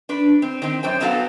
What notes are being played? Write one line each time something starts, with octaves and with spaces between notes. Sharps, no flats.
D4 B4
C4
D#3 C4
F#2 C5 G5
F#3 B3 C#4 F#4 A4 F5